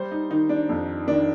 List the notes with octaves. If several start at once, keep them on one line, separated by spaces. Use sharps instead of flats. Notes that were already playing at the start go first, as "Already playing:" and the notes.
Already playing: G3 C5
D#4
D#3 D#4
D4
F2
D#3 D4